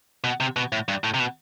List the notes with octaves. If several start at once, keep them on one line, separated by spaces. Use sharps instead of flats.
B2
C3
B2
A2
G2
A2
C3
B2